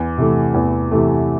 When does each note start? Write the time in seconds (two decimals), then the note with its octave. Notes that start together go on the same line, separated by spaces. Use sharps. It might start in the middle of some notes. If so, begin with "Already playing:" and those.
Already playing: E2
0.18 C3 E3 A3
0.54 E2
0.91 C3 E3 A3